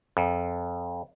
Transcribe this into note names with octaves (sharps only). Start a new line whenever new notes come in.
F2